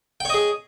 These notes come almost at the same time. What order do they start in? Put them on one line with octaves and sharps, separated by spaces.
G5 C#5 D#5 G#4